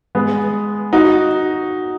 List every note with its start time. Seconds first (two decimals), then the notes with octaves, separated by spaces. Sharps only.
0.15 G#3 B3
0.93 D#4 F#4